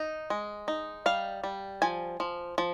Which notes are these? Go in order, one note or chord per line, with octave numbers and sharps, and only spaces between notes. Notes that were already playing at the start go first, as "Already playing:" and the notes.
Already playing: D#4
G#3
D#4
G3 F5
G3
F3 G#5
F3
F3